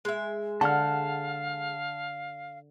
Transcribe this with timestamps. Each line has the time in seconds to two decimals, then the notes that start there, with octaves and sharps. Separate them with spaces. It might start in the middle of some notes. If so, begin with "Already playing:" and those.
0.05 G#3 E5
0.61 D3 F5 F#5 A5 F6